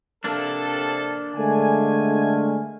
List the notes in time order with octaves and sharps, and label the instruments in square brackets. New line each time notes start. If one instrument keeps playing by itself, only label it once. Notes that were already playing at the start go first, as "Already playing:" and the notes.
[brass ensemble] C3 A4 [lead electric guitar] A#3 D4
[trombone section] D3 G#3 A3 [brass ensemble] G#5